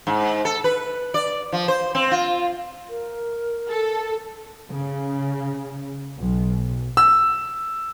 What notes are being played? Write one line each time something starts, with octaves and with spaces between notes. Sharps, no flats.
G#2
A4
B4
D5
F3
C5
C4
F4
A#4
A4
C#3
B1
E6